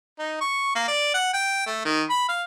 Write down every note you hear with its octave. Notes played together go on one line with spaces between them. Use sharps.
D#4
C#6
A#3
D5
F#5
G5
A3
D#3
B5
F5